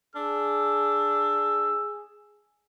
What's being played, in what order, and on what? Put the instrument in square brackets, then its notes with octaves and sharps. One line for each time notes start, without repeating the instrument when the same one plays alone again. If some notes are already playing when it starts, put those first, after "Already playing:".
[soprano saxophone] D4 [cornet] G#4 [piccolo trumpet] E6